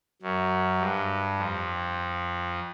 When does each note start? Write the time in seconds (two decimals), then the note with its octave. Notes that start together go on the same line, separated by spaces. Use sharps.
0.22 F#2
0.80 G2
1.38 F2